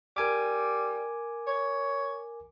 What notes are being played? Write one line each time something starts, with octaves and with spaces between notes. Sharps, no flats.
G3 A#4 G#5 D6
C#5